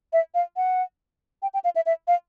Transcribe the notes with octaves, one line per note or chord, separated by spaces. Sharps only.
E5
F5
F#5
G5
G5
F5
E5
E5
F5